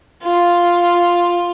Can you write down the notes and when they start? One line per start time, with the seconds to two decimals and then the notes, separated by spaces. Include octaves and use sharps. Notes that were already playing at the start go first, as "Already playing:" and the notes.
0.22 F4